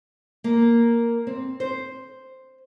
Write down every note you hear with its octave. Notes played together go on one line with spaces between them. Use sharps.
A#3
C4
C5